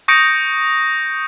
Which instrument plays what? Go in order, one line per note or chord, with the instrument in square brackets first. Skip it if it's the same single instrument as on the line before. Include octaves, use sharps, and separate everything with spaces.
[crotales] C#6 D#6 G6 A#6 C#7 D7